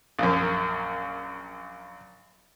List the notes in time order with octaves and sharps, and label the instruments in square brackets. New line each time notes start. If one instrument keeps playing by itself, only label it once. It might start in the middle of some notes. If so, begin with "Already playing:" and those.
[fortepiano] A#1 F#2